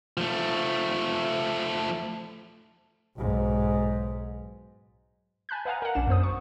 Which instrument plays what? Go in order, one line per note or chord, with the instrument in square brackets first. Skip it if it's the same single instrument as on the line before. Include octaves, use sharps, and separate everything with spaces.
[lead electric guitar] F3 A3
[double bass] B1 G#2
[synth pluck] G#5 A5 B5 F#6 G6
B4 D#5 F5 F#5 G#5 A#5
A#4 F#5
A#1 C#4 D4 E7
F#2 B3 C5 D#6
C#6